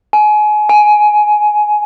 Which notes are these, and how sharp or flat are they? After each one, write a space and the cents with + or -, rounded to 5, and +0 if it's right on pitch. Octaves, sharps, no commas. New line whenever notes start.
G#5 +30
G#5 +15